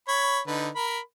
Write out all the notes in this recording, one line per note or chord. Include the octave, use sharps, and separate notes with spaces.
C#5 B5
D3 D#4 B4
A#4 B5